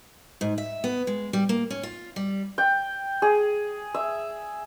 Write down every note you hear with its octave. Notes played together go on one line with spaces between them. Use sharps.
G#2
E5
B3
G#3
G3
A#3
C#4
F4
G3
G5
G#4
E5